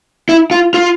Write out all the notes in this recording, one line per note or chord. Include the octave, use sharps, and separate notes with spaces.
E4
F4
F4